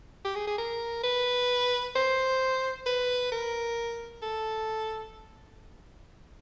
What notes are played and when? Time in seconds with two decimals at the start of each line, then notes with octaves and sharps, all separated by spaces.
0.25 G4
0.36 G#4
0.48 G#4
0.58 A#4
1.04 B4
1.96 C5
2.86 B4
3.32 A#4
4.23 A4